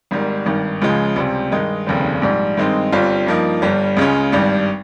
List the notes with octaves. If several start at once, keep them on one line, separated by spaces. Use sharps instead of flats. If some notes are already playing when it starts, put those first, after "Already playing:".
G#1 G#2 D#3 G3
G#1 G2 D#3
C#2 C#3 F3 G#3
C#2 C3 G3 C4
G2 D#3 G#3 D#4
F1 D#2 C#3 G3 C4
A#1 G#2 G3
G2 D#3 G#3 C4 D#4
G1 G2 G3 C4 F4
G2 F3 A#3 D#4
G1 G2 G3
C#2 C#3 G#3 C#4
G#1 G2 G3